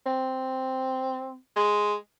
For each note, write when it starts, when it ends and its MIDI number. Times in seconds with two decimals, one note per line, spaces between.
0.06 1.38 60
1.56 1.94 56